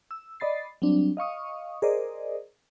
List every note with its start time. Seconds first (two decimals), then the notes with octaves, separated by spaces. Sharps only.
0.11 E6
0.40 D5 D#5 B5 A6 C7
0.82 F#3 G3 C4 D4
1.17 D#5 F5 C#6 D#6
1.82 G#4 A#4 C5 D5 D#5